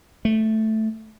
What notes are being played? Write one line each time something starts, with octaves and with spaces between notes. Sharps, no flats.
A3